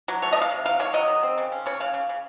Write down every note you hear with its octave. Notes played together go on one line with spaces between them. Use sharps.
F#3
A3 C#5
D#5
A3
F5
C3
F#3 F5
D#3 C#5
F#3 D#5
D#3
C4
C#3
C#4
C#3 C#5
C#3 F5
C#3
C#3